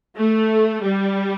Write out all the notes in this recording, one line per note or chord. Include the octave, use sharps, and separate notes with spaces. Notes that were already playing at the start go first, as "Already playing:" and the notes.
A3
G3